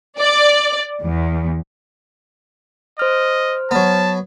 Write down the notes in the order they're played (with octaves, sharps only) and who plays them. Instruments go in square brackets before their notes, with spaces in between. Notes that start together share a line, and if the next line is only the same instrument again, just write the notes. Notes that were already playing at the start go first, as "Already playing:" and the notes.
[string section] D5
E2
[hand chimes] C5 F6 [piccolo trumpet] D#5
[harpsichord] F#3 B3 [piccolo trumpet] A5